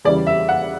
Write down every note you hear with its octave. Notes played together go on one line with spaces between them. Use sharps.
E2 C#3 E3 G3 D5
E5
F#5